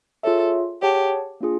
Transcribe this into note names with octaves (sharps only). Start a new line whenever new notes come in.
F4 G#4 A4 C#5 E5
G4 G#4 C#5 F#5 A5
A#3 D4 F4 G#4